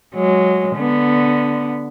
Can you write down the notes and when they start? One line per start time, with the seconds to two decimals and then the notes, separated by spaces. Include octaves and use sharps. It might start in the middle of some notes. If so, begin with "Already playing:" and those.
0.14 F#3 G#3
0.77 D3 B3